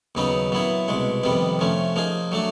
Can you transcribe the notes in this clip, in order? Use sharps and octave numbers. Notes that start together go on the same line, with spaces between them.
D#2 C#3 F#3 B3 D#4
A#2 F#3 B3 E4
C2 B2 G#3
F2 C3 D#3 G3 B3
C3 F3 A3 C#4
F3 A#3 D#4 G#4
F#3 A3 D4